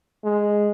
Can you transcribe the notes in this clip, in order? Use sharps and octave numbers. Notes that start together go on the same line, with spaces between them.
G#3